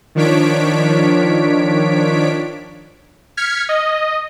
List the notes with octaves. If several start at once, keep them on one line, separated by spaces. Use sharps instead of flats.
D#3 F3 D4 C#5 B6 D7
F6 G#6 B6 C#7
D#5